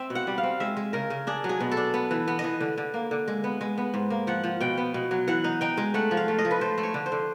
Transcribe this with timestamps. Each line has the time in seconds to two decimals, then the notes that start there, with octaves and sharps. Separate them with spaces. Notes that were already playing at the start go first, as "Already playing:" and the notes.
Already playing: C4 E5
0.10 B2
0.15 F#5
0.27 G3
0.38 F5
0.43 C4
0.60 G#3 E5
0.77 G#3
0.93 C#3 A#4
1.10 C#3
1.27 D4 G#4
1.44 F#3
1.49 G#4
1.60 B2
1.71 A4
1.77 D4
1.94 B3
2.11 E3
2.28 B3
2.39 D#5
2.44 E3
2.61 D3
2.78 D3
2.94 A#3
3.11 D3
3.28 G#3
3.44 B3
3.61 G#3
3.78 B3
3.94 G#2
4.10 A#3
4.27 F3 F#5
4.44 F3
4.60 B2 G5
4.77 B3
4.94 B2
5.11 F#3
5.28 E3 F#5
5.44 D#4
5.61 D#4 G5
5.77 G#3
5.94 A3 F#5
6.11 F3
6.17 F5
6.28 A3
6.38 D#5
6.45 F3
6.51 B4
6.61 A3 C5
6.78 A3
6.83 C#5
6.94 D3
7.06 C5
7.12 D3